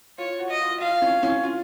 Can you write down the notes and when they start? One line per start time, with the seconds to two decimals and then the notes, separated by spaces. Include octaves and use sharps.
0.18 F4 C#5
0.39 F#4
0.50 D#5
0.60 F4
0.81 F4 F5
1.02 C#4
1.23 C#4
1.43 F4